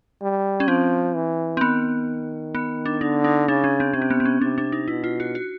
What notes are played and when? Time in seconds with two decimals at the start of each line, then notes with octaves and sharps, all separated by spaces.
0.22 G3
0.60 C#4
0.68 F3 C4
1.15 E3
1.57 C4
1.61 D#3 B3
2.55 B3
2.86 D4
3.01 D3 D#4
3.24 D#4
3.48 C#3 D4
3.64 C#4
3.80 C4
3.94 C3 C#4
4.02 C4
4.10 B3
4.20 C4
4.25 C#4
4.41 C3 D4
4.58 D4
4.72 D#4
4.88 B2 E4
5.04 F4
5.20 F#4
5.35 F#4